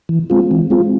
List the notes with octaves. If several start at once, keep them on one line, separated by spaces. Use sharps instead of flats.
E3
G#3 C4 F4
E3
G#3 C4 F4